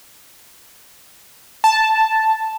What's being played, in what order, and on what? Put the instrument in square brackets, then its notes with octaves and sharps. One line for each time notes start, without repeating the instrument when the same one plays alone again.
[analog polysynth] A5